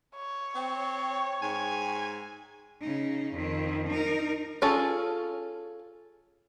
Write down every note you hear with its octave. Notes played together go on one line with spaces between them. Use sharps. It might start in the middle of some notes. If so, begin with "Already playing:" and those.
C#5
C4 G5
G#2 G#5
C#3 D#4
F2 D#3
D#4 A#4
C#4 F4 G#4 A4